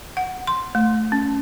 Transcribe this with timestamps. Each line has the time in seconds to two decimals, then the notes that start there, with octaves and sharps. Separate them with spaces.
0.17 F#5
0.47 C6
0.75 A3
1.12 C#4